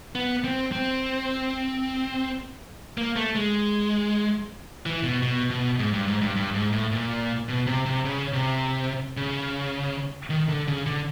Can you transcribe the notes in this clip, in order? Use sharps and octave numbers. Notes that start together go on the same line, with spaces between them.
B3
C4
C4
A#3
A3
G#3
E3
B2
B2
B2
G#2
G2
G#2
G2
G2
G#2
A2
A#2
B2
C3
C3
C#3
C3
C#3
D#3
D3
C#3
D3